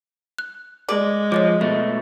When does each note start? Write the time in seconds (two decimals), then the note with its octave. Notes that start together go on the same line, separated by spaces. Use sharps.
0.39 F#6
0.89 G#3 D5
1.32 F3 C#5 D#5 D6
1.61 B2 A3 D#5